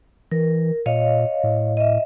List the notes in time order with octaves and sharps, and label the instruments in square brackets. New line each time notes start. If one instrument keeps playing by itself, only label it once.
[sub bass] E3 [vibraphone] A#4
[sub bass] A#2 [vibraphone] C#5 D#5 F5
[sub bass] A2
[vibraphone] D#5 E5